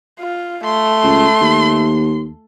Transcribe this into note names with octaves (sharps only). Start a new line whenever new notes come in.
F4
A3 C6
C#2
D#2